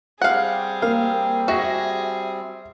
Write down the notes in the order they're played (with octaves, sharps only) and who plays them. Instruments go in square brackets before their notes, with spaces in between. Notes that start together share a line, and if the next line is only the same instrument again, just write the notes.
[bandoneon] G3 C4 [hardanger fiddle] G4 G#4 [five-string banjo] F5 F#5
[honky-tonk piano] A#3 [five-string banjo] F5
[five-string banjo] F#4 [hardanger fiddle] G#4 [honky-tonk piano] E5 A#6